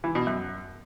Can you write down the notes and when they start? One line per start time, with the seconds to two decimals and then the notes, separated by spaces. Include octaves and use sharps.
0.04 E3
0.15 B2
0.27 F#2